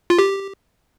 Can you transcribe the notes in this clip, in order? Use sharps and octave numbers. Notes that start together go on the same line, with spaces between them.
F4
G4